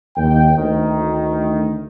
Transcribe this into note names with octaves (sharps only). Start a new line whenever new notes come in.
D#2 G5
D2 D#3